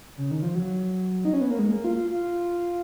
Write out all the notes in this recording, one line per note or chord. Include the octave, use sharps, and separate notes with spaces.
C#3
D#3
F3
F#3
D#4
C#4
B3
A#3
G#3
A#3
F4
F4
F4